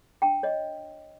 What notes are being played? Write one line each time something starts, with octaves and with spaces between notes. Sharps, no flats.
D4 G5 A5
C#5 D#5